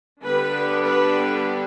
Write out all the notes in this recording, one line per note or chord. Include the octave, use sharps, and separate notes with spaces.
D3 G3 B3 D4 B4
B4